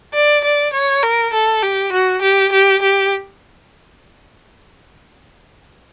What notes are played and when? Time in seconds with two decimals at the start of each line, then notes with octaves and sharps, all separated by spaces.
0.14 D5
0.44 D5
0.73 C#5
1.03 A#4
1.33 A4
1.63 G4
1.92 F#4
2.22 G4
2.52 G4
2.82 G4